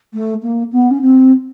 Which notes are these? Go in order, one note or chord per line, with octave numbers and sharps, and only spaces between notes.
A3
A#3
B3
C#4
C4